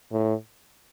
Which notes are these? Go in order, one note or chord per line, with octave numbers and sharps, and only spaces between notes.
A2